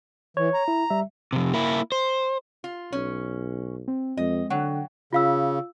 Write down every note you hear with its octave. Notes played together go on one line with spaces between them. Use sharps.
E3 C#5
A#5
E4
G3 E5
F2 C3
A#3 E4
C5
F4
B1 C#4
C4
F2 G#3 C4 D#5
D3 F#3 F#5 G5
C#3 F4 F5 E6